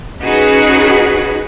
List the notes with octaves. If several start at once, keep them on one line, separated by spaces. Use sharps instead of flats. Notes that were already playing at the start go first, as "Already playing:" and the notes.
C#4 D#4 F#4 G#4 B4